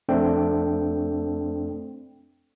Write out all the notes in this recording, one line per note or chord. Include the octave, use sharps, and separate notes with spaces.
F2 A3 C4 D4 A4 G5